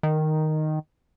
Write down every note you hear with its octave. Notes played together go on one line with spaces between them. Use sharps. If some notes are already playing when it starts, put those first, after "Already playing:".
D#3